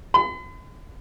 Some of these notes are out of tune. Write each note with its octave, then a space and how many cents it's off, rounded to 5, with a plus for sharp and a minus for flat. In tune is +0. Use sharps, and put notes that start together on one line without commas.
B5 +45